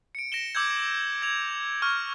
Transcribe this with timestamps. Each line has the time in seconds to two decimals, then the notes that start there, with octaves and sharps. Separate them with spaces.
0.15 C#7 D7
0.32 A#6 D7 E7 G7
0.55 D6 E6 G6 G#6
1.22 G#6 F7
1.82 C#6 F6